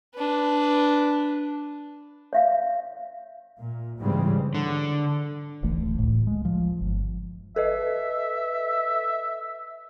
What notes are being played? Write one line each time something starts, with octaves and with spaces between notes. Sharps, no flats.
D4 B4
C#5 E5 F5
A#2
G#2 C#3 E3 G3 C4
D3
D1 G#1 E3 A3
C#2 A2
G#3
F3
G1
A4 B4 D#5 E5